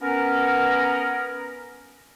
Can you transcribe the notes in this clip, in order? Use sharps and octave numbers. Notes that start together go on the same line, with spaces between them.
B3 C#4 A#4